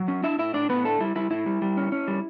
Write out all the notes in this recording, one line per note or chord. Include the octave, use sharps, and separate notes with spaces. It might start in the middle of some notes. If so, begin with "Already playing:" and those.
Already playing: F#3
C#4
D4 E4 E5
A2 E4 E5
A2 D4 D5
A2 B3 B4
A3 D4 A4
G3 E4
G3 E4
A2 E4
G3
G3
C#4
C#4
G3